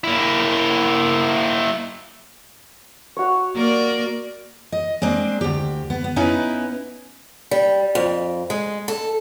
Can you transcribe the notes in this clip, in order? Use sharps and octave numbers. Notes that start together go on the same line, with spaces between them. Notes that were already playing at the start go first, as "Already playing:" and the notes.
A#3 E4
F#4 C#5
A#3 A#4 D5
D#5
G#3 A#3 C4 D4
D2 G4
B3
B3
B3 C#4 D#4 E4 B4
G3
F2
G#3
A4